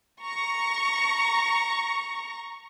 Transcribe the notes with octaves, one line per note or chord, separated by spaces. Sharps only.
A#5 C#6